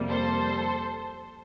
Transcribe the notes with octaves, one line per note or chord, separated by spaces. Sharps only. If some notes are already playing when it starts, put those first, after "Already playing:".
Already playing: F2 C3 G3 A#3
A4 C5